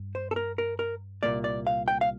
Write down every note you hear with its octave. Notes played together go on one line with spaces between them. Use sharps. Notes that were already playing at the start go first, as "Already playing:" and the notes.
Already playing: G2
C5
A4
A#4
A#4
A#4
C2 A#2 F3 A#3 D5
D5
F5
G5
F5